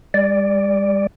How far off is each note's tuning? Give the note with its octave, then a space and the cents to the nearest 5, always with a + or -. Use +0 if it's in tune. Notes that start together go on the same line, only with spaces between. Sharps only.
G3 +45 D5 +0